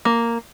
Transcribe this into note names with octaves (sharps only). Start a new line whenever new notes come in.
A#3